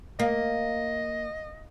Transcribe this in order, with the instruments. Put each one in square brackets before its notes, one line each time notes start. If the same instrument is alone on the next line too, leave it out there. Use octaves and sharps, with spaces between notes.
[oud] A#3 [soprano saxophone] D#5